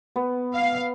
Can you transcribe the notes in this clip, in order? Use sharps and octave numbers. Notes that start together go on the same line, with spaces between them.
B3
F5